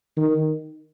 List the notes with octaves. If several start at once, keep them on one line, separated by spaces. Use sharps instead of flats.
D#3